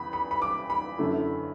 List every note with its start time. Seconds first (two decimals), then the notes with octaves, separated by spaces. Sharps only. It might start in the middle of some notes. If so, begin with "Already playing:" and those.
Already playing: E2 B3 B5
0.13 B5
0.31 B5
0.42 D6
0.70 B5
0.98 F#2 D3 A3 E4